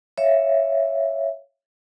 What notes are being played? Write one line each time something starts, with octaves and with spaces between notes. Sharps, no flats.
C#5 E5 F5